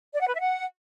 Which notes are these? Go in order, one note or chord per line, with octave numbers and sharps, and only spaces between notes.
D5
F#5
B4
E5
F#5